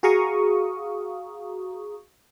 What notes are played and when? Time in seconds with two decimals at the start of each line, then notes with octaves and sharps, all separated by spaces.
0.03 F#4 G#4 F5 A#5 C#6 D#6